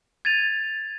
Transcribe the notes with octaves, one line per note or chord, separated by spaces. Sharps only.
G#6 A6 D#7 F7